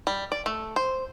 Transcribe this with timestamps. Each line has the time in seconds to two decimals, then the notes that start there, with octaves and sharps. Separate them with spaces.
0.07 G3
0.32 D5
0.46 A3
0.76 C5